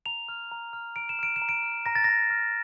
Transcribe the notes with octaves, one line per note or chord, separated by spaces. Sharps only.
A#5 F7
F6
A#5
F6
A#5 D7
E7
F6 D7
E7
A#5
D7
F6
A#5 A#6
A6
A#5 A#6
F6